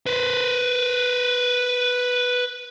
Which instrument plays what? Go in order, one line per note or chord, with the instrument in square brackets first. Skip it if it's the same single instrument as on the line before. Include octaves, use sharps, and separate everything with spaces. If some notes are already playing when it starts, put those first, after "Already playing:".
[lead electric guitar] B4 C5